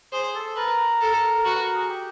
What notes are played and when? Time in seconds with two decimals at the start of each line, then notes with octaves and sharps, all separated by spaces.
0.13 G#4 C5
0.35 A4
0.56 A#4 B4
1.01 A4
1.45 F#4 B4
1.59 A#4
1.74 G#4
1.89 G4